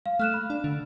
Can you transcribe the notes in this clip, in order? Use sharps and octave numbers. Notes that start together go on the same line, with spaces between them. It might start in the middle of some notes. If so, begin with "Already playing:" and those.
F5
A3 F6 F#6 E7
B5
D4
D3